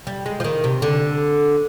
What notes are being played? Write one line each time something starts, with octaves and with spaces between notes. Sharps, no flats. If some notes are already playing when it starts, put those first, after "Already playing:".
G3
G#3
F3
D#3
C3
D3